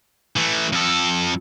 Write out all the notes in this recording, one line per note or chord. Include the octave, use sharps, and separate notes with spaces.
E3 A3
F2 A4